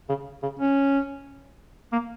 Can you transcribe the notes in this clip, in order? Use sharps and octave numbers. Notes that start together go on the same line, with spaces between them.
C#3
C#3
C#4
A#3